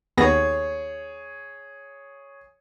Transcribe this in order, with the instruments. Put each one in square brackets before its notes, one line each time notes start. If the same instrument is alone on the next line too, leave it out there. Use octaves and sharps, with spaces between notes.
[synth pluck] D#2 B3 A#6 [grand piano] G#4 C#5